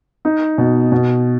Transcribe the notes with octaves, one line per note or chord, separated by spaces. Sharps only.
D#4
B2
B2